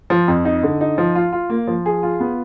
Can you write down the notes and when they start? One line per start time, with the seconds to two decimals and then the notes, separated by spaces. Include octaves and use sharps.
0.10 F3
0.28 F2
0.45 D#4
0.63 D3
0.81 D#4
0.98 F3
1.15 F4
1.32 F4
1.50 A#3
1.68 F3
1.86 G#4
2.03 F4
2.20 B3